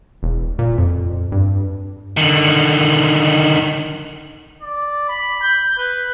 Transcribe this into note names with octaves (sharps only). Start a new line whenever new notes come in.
E1
A#2
F2
G2
D3 D#3
D5
B5
G6
B4